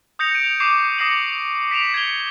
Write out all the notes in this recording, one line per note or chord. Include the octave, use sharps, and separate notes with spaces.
D#6 G6 A#6 C#7 F7
G6 D7 D#7
C#6 D6 G6 C7
D6 D#6 A#6 C7 C#7 F#7
B6 D7 E7 F7
G#6 C#7 G7